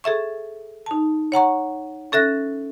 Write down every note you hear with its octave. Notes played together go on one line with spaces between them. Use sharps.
G#4 A4 E5 C#6
D#4 A5
C#5 F#5 A#5 C#6
C#4 A4 E5 F#6 A#6